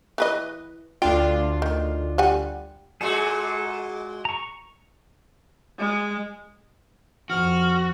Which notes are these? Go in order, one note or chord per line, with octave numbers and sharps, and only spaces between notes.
E3 B4 D#5
D2 D4 F4 G5
D#3
G3 F#5 G#5
A#2 G#3 F#4 G#4 A4
A#5 C#6
G#3
F2 F#4 F6